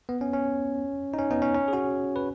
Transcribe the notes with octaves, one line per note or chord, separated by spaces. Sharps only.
B3
C#4
C#4
D#4
C#4
B3 D#4
C#4
C#4
G#4
C#4 F#4
B4